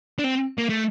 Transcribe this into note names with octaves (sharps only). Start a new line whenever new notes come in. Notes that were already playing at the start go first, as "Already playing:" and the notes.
D4
C4
A#3
A3